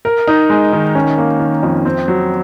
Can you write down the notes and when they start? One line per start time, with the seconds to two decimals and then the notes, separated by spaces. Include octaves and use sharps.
0.05 A#4
0.27 D#4
0.50 G#3
0.73 D#3
0.95 C#4
1.18 A#3
1.40 D#3
1.63 F2
1.85 C4
2.08 F#3